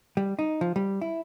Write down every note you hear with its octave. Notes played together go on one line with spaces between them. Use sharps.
G3
D#4
F3
G3
E4